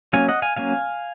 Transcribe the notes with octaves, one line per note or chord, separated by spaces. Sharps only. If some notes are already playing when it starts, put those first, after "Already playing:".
F#3 A#3 C#4 F5 G#5
D#5 F#5
F5 G#5
F#3 A#3 C#4 F5 G#5